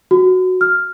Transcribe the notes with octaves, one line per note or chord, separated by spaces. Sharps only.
F#4
F6